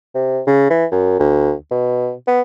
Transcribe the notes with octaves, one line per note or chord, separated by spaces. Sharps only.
C3
C#3
E3
F#2
D2
B2
B3